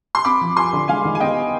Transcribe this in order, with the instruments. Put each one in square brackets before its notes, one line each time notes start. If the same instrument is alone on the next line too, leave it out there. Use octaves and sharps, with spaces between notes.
[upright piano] C6
[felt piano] C4 [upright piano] B5 D6
[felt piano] F3
[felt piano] F4 [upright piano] G#5 C6
[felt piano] D3
[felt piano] G#3 [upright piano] F5 G#5
[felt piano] D#3
[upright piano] G#5
[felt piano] B3 [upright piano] D#5 G5